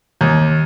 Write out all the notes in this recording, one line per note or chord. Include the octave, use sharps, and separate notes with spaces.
D#2